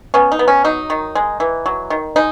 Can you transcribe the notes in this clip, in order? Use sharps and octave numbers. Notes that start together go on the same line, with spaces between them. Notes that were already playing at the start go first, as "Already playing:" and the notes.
B3 C#4
D#4
B3
C#4
F#3 D#4
D#3
G#3
E3
F#3
D#3
G#3 D#4